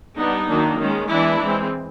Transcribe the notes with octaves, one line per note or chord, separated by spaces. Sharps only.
G3 B3 D4 D#4
D#3 F#3 A#3 D4
D#3 G#3 C#4
E3 G#3 B3 D4 E4
E3 G#3 C4